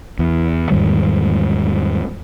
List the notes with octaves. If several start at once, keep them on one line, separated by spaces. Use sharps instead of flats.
E2
E2 G#2 D#3 G3